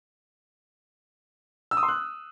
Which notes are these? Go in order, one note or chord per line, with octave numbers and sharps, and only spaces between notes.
E6
D#6
C6
F#6